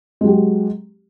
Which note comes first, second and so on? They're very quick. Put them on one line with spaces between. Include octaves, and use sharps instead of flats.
G#3 F#3 G4